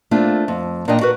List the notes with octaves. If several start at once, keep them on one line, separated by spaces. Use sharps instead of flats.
A3 A#3 C4 D4 F4
F2
A#2 D4 D#4 A#4 D#5 G5
F#4 A#4 B4